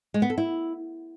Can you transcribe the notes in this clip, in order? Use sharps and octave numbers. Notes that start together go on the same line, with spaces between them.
G#3
B3
A4
E4